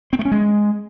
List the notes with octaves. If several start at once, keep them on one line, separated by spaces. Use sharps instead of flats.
C4
A3
C#4
G#3